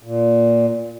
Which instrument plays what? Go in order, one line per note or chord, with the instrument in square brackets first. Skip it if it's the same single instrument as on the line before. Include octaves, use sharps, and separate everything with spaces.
[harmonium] A#2